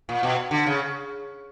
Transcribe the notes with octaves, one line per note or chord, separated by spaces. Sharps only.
A#2
B2
D3
C#3